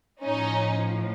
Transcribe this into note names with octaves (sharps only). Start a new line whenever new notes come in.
A2 F3 C#4 D#4